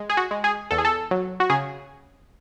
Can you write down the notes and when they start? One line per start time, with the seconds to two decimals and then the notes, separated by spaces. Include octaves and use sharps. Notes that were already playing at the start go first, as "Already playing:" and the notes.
Already playing: G#3
0.10 G#4
0.17 F#4
0.31 G#3
0.44 G#4
0.71 E2 A4
0.78 G#4
0.85 A4
1.11 F#3
1.40 F#4
1.50 C#3 G#4